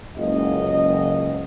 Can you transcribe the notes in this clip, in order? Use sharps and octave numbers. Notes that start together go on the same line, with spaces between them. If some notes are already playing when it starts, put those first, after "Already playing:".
F#1 C#2 D#5